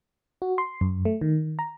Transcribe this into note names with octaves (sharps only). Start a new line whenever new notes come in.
F#4
C6
F#2
A3
D#3
A#5